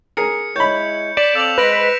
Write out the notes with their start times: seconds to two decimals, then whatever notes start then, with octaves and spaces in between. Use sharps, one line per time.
0.17 G#4 A#4 C#7
0.56 G#3 E4 C#5 B5 G6
1.17 D5 B6 E7 F#7
1.35 C4 A4 F5 E6 F7 F#7
1.58 G#3 B4 C5 F#6 A#6 D7